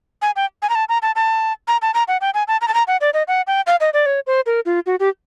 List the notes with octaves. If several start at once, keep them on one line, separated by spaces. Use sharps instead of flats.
G#5
G5
G#5
A#5
A5
A#5
A5
A5
A#5
A5
A#5
F#5
G5
G#5
A5
A#5
A5
A#5
F#5
D5
D#5
F#5
G5
F5
D#5
D5
C#5
C5
A#4
F4
F#4
G4